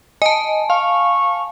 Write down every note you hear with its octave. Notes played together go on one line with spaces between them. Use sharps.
D#5 G#5 A5
F5 C#6